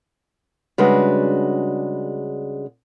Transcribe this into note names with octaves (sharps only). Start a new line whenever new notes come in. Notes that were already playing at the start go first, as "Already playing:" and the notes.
C#3 G3 G#3 D4 F#4 B4